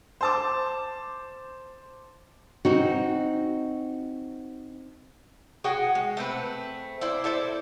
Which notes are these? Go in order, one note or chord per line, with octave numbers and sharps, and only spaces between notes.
C5 A5 D6
C4 D#4 F#4
F#4 G#4 F#5 G5
G#3
A3 C4 B4
E4 C5 D5
E4 A4 C5 D5